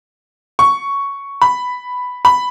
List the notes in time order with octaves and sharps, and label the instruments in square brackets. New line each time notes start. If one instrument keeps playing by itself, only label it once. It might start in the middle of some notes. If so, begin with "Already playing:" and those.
[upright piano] C#6
B5
B5